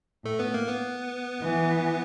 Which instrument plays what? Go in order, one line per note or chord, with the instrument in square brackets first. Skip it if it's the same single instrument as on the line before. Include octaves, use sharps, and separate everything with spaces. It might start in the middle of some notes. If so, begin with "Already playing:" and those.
[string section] A2 [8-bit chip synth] A3 A4
[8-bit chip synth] B3 B4
A#3 A#4
B3 B4
[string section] E3